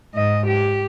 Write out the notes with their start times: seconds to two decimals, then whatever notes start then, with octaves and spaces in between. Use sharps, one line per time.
0.14 G#2 D#5
0.47 G4